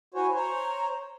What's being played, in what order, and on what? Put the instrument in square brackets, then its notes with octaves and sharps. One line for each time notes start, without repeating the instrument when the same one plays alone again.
[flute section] E4 G#5 [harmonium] F#4 C5 C#5
[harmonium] C5 C#5 [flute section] A#5